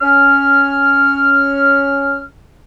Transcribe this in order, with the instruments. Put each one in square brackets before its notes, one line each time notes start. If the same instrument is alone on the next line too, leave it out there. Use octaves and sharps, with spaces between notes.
[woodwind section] C#4 F6